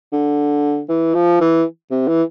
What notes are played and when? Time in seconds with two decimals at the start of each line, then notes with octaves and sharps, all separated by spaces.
0.13 D3
0.89 E3
1.15 F3
1.41 E3
1.91 C3
2.08 E3